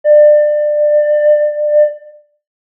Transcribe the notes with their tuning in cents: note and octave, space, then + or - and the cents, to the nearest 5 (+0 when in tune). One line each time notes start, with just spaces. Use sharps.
D5 +25